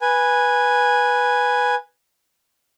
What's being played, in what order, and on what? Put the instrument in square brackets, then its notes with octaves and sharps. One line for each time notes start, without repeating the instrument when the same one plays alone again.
[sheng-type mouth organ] B4 G#5